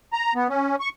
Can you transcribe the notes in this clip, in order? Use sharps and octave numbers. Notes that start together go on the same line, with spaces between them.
A#5
B3
C#4
C#6